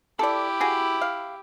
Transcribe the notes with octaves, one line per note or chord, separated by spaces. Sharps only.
E4 G4 A4 D5
F#4 G#4
F5